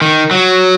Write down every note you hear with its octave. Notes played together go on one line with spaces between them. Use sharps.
D#3
F#3